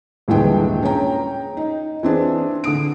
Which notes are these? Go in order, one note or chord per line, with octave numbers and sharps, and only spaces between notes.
D#1 G2 D3 E3 G#3 G5
C#4 G#4 C#5 G5 A#5
D#4
E3 C4 D4 G#4
D3 D#6 D7